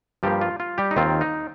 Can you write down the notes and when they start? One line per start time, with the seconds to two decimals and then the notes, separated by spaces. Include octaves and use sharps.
0.23 G2 F3 G3 A#3 G4
0.41 F4
0.60 F4
0.78 G3 G4
0.91 D#4
0.96 D#2 D#3 C4 F4
1.21 D#4